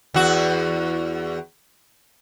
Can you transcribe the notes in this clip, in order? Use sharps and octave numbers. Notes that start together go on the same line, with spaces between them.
E2 F#4